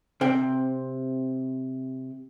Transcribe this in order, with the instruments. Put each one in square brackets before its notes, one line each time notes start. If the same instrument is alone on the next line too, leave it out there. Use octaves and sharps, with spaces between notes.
[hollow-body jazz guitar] C3 C4 G5